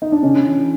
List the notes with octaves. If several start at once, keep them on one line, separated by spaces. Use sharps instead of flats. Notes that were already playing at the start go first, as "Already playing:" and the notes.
D#4
D4
C#3 C#4
E3